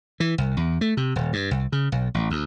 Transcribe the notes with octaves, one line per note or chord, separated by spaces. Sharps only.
E3
C2
E2
A3
C3
D#1
G2
C2
C#3
B1
A1
D2